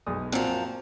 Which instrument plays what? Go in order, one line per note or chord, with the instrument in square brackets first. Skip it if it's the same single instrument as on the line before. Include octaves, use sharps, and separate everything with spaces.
[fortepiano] B1 G#3 D#6
[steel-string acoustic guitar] F#2 F3 [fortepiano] A#2 C4